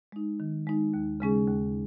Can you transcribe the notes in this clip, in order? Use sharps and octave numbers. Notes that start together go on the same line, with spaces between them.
G#3 D#4
D#3
G#3 D#4
D#2
C#3 G#3 C#4 G#4
D#2